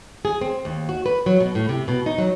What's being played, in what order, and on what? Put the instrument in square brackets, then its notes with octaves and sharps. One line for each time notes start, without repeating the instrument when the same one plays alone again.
[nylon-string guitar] G#4
C4
D#2
F#4
B4
F#3
B2
A2
C3
B2
D#4
F#3